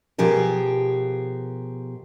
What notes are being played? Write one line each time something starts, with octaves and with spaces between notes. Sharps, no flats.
B2 F3 G4 G#4 A#4